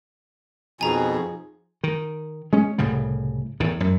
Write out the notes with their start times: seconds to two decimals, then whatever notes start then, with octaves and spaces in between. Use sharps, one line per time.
0.81 F2 B2 F3 D#4 G#4 G#5 A#5
1.84 D#3
2.53 G#3 C#4
2.78 C2 A2 C#3 G3
3.60 E2 A2 D#3
3.80 F#2